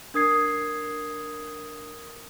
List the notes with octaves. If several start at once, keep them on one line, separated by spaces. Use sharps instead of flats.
D4 A#4 D#6 G#6 C7